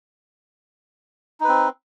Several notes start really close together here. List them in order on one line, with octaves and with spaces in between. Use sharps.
D#4 B4 C4